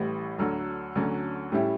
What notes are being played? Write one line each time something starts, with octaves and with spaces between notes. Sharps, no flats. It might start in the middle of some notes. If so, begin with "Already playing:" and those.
Already playing: A1 A2 E3 G3
D2 D3 F#3
D2 D3 F#3 C#4
A2 G3 C#4 E4 G4